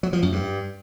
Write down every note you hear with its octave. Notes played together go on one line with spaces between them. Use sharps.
F#3
F3
F#2
G2